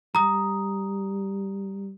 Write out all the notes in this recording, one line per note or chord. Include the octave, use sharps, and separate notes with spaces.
G3 A#5 D#6